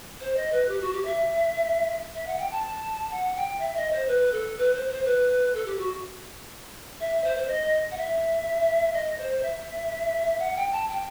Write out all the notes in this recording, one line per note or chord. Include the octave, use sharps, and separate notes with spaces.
C5
D#5
B4
G4
F#4
G4
E5
E5
F#5
G5
A5
F#5
G5
E5
D#5
C5
B4
A4
B4
C5
C5
B4
A4
G4
F#4
E5
C5
C5
D#5
F#5
E5
D#5
C5
E5
F#5
G5
A5
G5